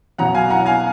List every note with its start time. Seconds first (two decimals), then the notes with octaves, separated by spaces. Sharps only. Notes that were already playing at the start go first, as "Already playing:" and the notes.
0.18 B1 B2 F#3 F#5 A#5
0.34 F5 G#5
0.50 F#5 A#5
0.66 F5 G#5